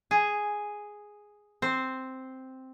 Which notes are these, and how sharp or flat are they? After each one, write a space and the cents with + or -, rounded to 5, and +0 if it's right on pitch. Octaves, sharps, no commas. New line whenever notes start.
G#4 +0 G#5 +0
C4 +0 C5 +0